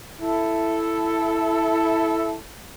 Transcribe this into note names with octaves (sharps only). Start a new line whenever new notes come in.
E4 A4